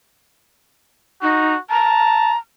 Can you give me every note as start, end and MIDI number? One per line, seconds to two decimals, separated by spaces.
1.22 1.53 63
1.22 1.59 66
1.70 2.35 81
1.70 2.37 82